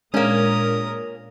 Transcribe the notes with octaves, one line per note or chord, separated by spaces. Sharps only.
A#2 G#3 A#3 C#4 D4 A#4 A#5 D#6